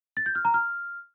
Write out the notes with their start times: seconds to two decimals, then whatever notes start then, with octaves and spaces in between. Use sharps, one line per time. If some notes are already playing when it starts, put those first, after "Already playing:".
0.17 A6
0.26 G6
0.35 F6
0.45 A#5
0.54 F6